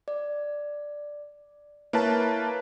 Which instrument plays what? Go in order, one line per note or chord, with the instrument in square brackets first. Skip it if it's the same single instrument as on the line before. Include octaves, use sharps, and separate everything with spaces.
[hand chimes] D5
[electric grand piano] A#3 B4 A5 [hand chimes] E4 C#5 E5